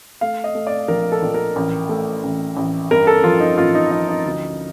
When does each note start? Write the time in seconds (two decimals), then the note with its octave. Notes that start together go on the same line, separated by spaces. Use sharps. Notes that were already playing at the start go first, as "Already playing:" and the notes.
0.21 A3 F5
0.44 D#5
0.55 A3
0.67 D5
0.88 A#1 A#4
1.12 A4
1.22 A#1
1.34 A#4
1.56 A1
1.89 A3
2.24 A1
2.57 A1
2.91 G2 A#4
3.07 A4
3.24 F3 F4
3.40 D#4
3.57 A1 F4
3.75 D#4
3.91 F3 D#4
4.08 D#4
4.25 D2